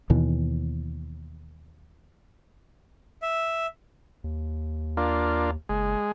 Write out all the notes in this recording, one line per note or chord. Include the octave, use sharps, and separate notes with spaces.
D#2 B2 E3
E5
D#2
A#3 D4 F4
F#1 G#3